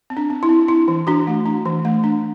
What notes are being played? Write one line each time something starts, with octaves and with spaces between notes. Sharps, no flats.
C4
D4
C4
E4
C4
D4 E4
E3
E3 D4 F#4
A3
D4
E3
A3
D4